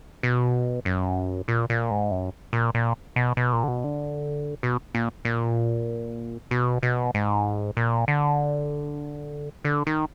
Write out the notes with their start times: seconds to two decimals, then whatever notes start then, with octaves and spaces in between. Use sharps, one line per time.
0.23 B2
0.85 F#2
1.48 A#2
1.70 A#2
1.91 G#2
2.11 F#2
2.53 A#2
2.75 A#2
3.16 B2
3.37 B2
3.53 A#2
3.64 D3
3.68 B2
3.84 D3
4.63 B2
4.95 A#2
5.25 A#2
6.51 B2
6.83 B2
7.14 G#2
7.77 A#2
8.08 D3
9.65 D3
9.87 D#3